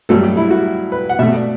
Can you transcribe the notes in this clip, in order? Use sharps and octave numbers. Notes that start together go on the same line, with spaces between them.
G2 F#3 A3 A4
G4
E4
F#4
B4
F#5
B2 A3 E5
D5